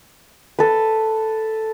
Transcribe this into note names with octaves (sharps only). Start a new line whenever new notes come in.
A4 B4